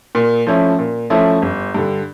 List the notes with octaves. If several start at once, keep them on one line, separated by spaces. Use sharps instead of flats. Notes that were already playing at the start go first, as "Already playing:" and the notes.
A#2
F3 A3 C#4 E4
A#2
F3 A3 C#4 E4
G1
G2 D3